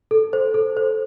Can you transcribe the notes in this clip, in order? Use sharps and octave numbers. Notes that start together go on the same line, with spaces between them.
A4
C5
A4
C5